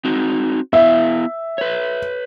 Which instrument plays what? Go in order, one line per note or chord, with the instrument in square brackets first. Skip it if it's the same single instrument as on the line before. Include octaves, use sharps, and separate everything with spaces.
[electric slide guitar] C4 D#4 F#4
[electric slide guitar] B3 E4 F5 [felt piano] E5
[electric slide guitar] B4 C#5